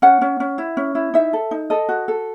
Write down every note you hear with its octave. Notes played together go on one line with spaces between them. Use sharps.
C#4 F#5
C#4
C#4
E4
C#4
E4
D#4 E5
A4
D#4
A4 D#5
F#4
A4